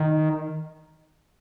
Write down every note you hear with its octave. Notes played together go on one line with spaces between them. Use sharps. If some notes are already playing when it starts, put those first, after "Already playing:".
Already playing: D#3